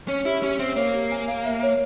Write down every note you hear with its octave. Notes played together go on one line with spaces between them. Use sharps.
C#4 C#5
E4 G4
C#4 G4
C4 E5
A#3 C#5
G4
G#5
F5
E5
C#5